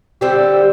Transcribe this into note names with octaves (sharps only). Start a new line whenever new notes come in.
D3 G3 C4 G4